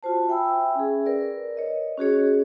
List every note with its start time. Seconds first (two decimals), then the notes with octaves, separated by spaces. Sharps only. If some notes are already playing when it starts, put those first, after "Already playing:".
0.03 F4 F#4 C5 A5
0.29 E5 G5 G#5 B5 E6
0.75 C#4 G#4
1.06 A#4 B4 D5
1.57 C#5 D#5
1.98 C#4 F#4 G#4 C#5